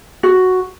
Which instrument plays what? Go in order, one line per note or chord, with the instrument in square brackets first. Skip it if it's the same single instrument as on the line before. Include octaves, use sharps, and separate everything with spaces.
[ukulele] F#4